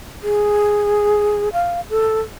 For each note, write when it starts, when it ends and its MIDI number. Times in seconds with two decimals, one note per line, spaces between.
0.23 1.49 68
1.53 1.81 77
1.90 2.21 69